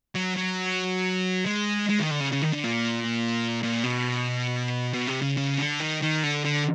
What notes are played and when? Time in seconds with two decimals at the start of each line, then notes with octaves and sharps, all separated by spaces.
0.15 F#3
0.36 F#3
1.46 G#3
1.89 G#3
2.00 D#3
2.11 D3
2.21 C#3
2.33 C#3
2.42 D#3
2.53 D3
2.64 A#2
3.63 A#2
3.84 B2
4.94 B2
5.07 C3
5.22 C#3
5.37 C#3
5.58 D3
5.80 D#3
6.02 D#3
6.23 D3
6.45 D3